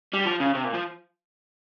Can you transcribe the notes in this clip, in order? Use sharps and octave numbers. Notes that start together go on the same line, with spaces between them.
G3
F3
C#3
C3
A#2
F3